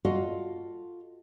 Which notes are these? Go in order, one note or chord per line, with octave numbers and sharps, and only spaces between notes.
F4 F#4 A4 D#5 F5